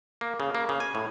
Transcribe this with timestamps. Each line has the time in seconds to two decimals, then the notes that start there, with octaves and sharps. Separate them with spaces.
0.21 A#3
0.40 C#3
0.55 A#3
0.69 C#3
0.80 G#5
0.95 A2